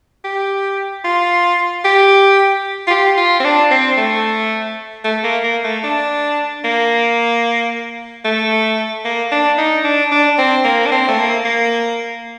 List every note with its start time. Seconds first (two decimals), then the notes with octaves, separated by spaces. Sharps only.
0.24 G4
1.04 F4
1.84 G4
2.87 F4
2.91 G4
3.18 F4
3.40 C4
3.44 D4
3.71 C4
3.98 A3
5.05 A3
5.24 A#3
5.44 A#3
5.64 A3
5.84 D4
6.65 A#3
8.25 A3
9.05 A#3
9.32 D4
9.58 D#4
9.85 D4
10.12 D4
10.38 C4
10.65 A#3
10.86 D4
10.92 C4
11.08 A3
11.19 A#3
11.45 A#3